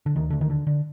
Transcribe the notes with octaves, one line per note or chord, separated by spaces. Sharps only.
D3
D2 D#3
D2 D3
D#3
D3
D3